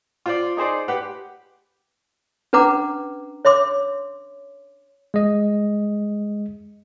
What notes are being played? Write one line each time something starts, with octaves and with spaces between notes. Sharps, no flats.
F4 C5 D5
D#4 G#4 C5 D5
G4 B4 F#5
C#4 D4 B4 F#5 A#5 D6
C#5 E5 C6 D6
G#3 D#5